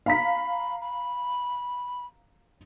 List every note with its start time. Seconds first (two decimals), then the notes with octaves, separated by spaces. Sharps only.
0.06 F5 A#5 B5 B6
0.80 B5